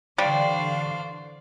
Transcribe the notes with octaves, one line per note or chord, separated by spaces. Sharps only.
D3 E3 G3 D4 C5 D5 F5 C#6